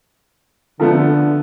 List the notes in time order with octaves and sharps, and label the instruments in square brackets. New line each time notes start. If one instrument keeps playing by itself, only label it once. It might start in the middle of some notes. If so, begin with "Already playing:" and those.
[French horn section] D3 [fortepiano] F3 A3 B3